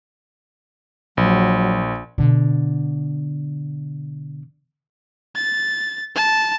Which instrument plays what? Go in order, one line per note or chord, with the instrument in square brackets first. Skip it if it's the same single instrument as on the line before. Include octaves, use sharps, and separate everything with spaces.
[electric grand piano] A#1 [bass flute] F#3
[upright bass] B2 D3
[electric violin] A6
A5